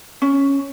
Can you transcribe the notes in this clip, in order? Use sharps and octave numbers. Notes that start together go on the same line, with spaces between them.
C#4